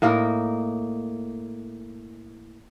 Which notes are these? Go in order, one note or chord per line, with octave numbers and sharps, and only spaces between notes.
A2 A#3 D#4 A#4